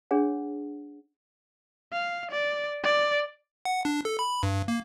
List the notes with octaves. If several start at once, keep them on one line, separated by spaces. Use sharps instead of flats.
D4 G#4 C#5 F#5
F5
D5
D5
F#5
D4
A4
B5
G2
A#3